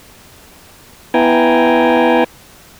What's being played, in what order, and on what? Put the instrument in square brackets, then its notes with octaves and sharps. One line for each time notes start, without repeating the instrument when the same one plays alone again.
[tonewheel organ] B3 E4 G5 G#5 A#5